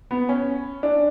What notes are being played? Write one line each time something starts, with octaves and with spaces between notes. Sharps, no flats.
B3
C#4
D4